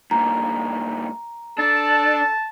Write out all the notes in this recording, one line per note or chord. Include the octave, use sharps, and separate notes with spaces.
G2 A#2 A#5
D4 A4 A5